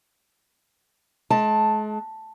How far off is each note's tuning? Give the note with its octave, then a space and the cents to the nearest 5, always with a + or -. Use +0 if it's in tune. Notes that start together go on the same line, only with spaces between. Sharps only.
G#3 +40 A5 +0